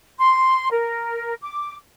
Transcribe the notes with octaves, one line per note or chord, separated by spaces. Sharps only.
C6
A#4
D6